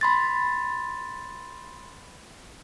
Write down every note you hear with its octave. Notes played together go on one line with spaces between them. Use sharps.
B5 C6 A6